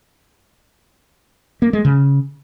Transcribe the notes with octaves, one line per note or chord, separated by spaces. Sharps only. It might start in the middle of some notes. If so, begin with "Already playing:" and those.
A#3
G#3
C#3